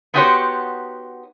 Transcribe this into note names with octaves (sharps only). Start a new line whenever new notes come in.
B3 D#4 F#4 G4 C5 C#5